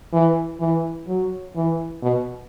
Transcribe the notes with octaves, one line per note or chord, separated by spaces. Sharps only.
E3
E3
F#3
E3
B2